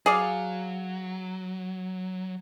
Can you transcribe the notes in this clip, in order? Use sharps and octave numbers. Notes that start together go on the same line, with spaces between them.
F#3 G#4 D5 F5